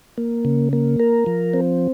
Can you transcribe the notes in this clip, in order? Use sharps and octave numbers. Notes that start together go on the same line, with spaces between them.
A#3
C#3
A#3
A#4
F3
C4